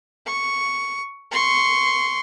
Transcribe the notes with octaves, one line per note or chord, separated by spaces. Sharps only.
C#6
C6 C#6